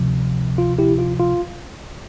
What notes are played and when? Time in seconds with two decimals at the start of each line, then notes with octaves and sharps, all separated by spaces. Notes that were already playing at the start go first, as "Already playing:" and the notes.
Already playing: D2 C3 F3
0.58 F4
0.78 E4 G4
0.99 F4
1.20 F4